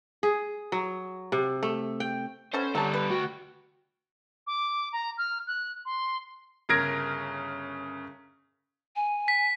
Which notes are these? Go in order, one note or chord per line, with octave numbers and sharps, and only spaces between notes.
G#4
F#3
C3
A3
G5
B2 C#4 A4 C5
D3 F#3 G3 A4 A5
B4
D2 F#4 G5
D6
A#5
F6
F#6
C6
G1 C#3 A#4 G#6 A#6 D7
G#5
B6